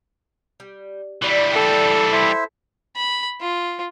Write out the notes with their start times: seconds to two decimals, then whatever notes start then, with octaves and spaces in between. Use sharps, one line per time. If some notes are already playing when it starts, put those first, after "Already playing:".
0.60 G3
1.22 D3 E3 G3 D5
1.52 A4 G5
2.12 E4 C5 E5
2.96 B5
3.41 F4